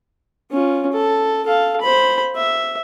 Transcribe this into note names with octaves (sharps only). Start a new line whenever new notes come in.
C#4 F4
A4
A4 F5
C5 B5
E5